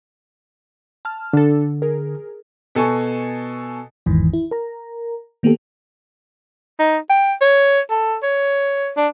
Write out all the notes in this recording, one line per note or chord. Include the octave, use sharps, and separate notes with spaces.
A5 F6
D3 D4 A4
G#4 A#4
B2 A4 G#5 C#6
G1 E2 G#2 D#3 E3
E4
A#4 A#5
D#3 A#3 B3 G4 A4
D#4
G5
C#5
A4
C#5
D4